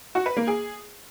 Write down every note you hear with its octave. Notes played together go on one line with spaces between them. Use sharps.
F#4
B4
A#3
G#4